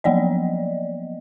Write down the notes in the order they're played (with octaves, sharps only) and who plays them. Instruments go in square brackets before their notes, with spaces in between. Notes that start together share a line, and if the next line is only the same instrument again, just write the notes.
[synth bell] F3 F#3 A#3 B3 D5 D#5